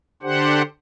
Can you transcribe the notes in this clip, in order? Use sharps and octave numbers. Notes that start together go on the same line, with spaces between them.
D3 D4 G4 C5 F#5